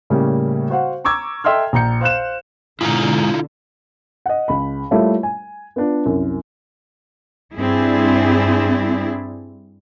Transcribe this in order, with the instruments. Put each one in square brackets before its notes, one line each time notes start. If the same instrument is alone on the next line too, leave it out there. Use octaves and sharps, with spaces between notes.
[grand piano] A2 C#3 G3 A#3 C#4
F#4 C5 F5 F#5
A#5 C#6 D6 E6 G#6
A4 D#5 E5 G5 C6 F6
A#1 A#5 G6 C#7
C5 F5 F#6 E7
[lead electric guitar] G#2 [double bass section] B2 D3 [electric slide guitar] E4 F4 A#5
[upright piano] D#5 F#5
C#2 B5
G3 A3 A#3 E4 F4 C#5
G#5
B3 D4 F4
C2 F#2
[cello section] G2 C4 D4 E4 G#4